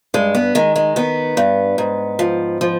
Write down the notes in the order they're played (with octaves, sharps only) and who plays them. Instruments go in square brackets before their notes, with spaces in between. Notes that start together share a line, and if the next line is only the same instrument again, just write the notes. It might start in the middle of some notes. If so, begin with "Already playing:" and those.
[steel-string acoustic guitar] G2 G#3
B3
D#3 G#3
G#3
D#3 B3
G2
G#2
F3
F3